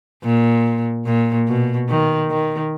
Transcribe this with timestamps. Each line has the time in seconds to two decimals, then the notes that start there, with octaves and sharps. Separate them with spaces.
0.24 A#2
1.06 A#2
1.47 B2
1.89 D#3
2.30 D#3